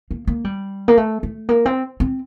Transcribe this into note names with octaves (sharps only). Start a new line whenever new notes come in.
A#3
A#3
G3
A#3
A3
A3
A#3
C4
C4